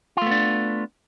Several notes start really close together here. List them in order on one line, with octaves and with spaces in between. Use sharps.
F4 A3 B3 D4